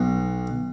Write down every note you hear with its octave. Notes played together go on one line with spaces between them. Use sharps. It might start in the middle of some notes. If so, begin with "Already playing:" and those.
Already playing: B1 B2